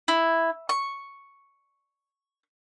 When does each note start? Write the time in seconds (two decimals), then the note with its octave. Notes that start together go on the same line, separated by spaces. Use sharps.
0.08 E4
0.69 C#6